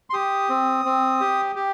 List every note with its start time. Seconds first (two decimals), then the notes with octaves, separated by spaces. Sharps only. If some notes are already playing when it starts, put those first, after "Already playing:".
0.10 C6
0.13 G4 D#6
0.49 C4
0.85 C4
1.21 G4
1.56 G4